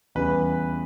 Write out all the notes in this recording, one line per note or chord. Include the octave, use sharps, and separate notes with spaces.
E2 C#3 E3 G3 B4